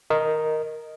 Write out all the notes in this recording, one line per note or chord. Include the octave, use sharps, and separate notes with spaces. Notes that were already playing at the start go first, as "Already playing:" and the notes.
A#4 D#5